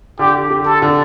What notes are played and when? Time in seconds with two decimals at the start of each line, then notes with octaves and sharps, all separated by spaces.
0.19 D3 G4
0.50 G4
0.66 A4
0.82 D3